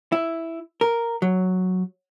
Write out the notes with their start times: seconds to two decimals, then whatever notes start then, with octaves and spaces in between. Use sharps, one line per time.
0.12 E4
0.81 A#4
1.22 F#3